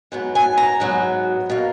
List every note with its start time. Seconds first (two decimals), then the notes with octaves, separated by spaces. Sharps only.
0.12 G#2 F#3 B3
0.35 G#5
0.58 A#5
0.80 G#2 F#3 B3
1.50 B2 A#3